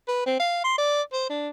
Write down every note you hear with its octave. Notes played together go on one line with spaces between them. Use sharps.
B4
C4
F5
C6
D5
C5
D4